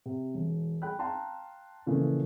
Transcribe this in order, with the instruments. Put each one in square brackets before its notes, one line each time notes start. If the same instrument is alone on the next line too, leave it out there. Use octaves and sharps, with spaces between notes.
[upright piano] C3
E1
G#4 G5 B5 F#6
F5 G5 A5 A#5 C6
A#2 C#3 E3 F3 A3 A#3